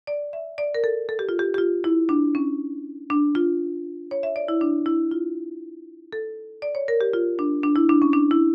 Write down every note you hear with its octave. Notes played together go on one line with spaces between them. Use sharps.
D5
E5
D5
A#4
A4
A4
G4
F4
G4
G4
F4
E4
D4
C#4
D4
F4
C#5
E5
D5
E4
D4
E4
F4
A4
D5
C#5
A#4
G4
F4
D4
D4
E4
D4
C#4
D4
E4